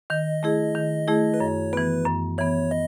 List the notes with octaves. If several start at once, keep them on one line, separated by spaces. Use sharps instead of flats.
D#3 D#5
A3 E4 G#4
D#3
A3 E4 G#4
B4
F#2 C#5
E3 B3 B4
F#2
E3 B3 C#5
D#5